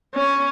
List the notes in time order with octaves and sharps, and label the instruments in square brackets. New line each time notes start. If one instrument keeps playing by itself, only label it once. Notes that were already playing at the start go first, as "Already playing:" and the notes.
[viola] C#4